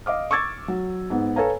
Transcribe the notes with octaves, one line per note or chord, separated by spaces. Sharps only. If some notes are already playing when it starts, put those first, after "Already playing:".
D#5 F5 D6 F6
C#6 D6 E6 G#6 A6
F#3
G#2 B3
A4 B4 C#5 F5 G#5 A#5